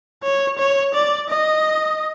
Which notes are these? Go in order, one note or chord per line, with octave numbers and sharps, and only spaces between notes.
C#5
C#5
D5
D#5